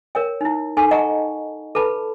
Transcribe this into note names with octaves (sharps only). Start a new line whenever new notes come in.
A#4 C#5 G5
D#4 E4
D#4 A4 G#5 C6 C#6
D#5 F#5 G5 A5 A#5 C#6
A4 B4 A5 B5